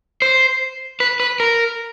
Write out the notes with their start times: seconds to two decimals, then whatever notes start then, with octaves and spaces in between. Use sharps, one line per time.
0.22 C5
1.00 B4
1.20 B4
1.40 A#4